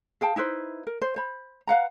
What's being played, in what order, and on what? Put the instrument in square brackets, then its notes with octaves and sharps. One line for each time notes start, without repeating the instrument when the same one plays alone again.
[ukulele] G#4 F5 G5 A5
D#4 E4 B4 C5
A#4
C5
C5 B5
B4 F5 F#5 A#5